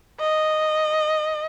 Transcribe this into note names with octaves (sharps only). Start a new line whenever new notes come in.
D#5